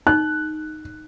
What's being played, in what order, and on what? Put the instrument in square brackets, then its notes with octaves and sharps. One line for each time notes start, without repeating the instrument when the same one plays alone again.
[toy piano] D#4 [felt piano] F#6